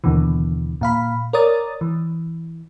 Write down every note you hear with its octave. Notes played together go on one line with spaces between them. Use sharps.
D#2 B2 D3 E3
A#2 F5 B5
A#4 C#5 D5 D#6 A6
E3